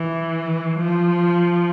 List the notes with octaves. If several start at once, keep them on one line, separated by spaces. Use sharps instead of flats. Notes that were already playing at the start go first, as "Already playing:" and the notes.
Already playing: E3
F3